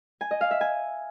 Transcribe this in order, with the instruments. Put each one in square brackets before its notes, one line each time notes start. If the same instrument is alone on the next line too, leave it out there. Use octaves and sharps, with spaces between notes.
[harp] G#5
D#5
F5
E5
G#5